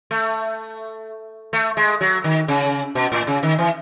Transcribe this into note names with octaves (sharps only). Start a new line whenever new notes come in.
A3
A3
G#3
F#3
D#3
C#3
B2
A2
C#3
D#3
E3